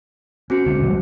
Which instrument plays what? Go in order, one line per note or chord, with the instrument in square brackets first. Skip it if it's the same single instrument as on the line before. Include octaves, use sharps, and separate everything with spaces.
[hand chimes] C4 F#4 C#7 [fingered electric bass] C#4
[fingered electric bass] C#2 D3 G#3
B2 F3 G3